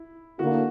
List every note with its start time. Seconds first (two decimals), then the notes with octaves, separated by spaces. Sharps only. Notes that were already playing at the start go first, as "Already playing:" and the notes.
Already playing: E4
0.39 D3 A#3 E4 F#4